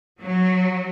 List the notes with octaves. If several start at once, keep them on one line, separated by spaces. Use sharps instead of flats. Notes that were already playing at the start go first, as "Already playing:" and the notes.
F#3